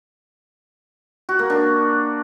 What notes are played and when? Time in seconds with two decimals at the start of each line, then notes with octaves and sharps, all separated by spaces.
1.29 F#4
1.39 A#3
1.50 D4